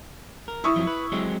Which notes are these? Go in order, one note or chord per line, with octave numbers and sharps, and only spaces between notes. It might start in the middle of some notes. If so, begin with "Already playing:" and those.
A#4
E4 C#6 D#6
F2 F3 F#3
B4
F#3 G#3 C4